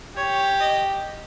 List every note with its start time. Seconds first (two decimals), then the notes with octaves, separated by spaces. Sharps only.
0.17 G4 C#5
0.60 D#5